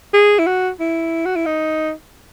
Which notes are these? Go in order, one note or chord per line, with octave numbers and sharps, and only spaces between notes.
G#4
E4
F#4
E4
F#4
E4
D#4